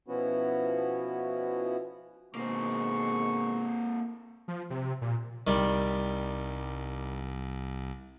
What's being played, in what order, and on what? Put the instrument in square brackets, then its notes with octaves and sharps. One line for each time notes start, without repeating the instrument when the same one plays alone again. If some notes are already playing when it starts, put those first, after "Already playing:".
[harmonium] B2 F3 B3 C#4 E4 F#4
[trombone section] B2 D#3 G#3 [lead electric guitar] A#3 C4 [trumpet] C#6
[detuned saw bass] F3
C3
A#2
[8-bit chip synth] C2 [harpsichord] D#3 G3